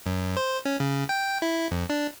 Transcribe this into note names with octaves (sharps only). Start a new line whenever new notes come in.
F#2
C5
C#4
C#3
G5
E4
F2
D4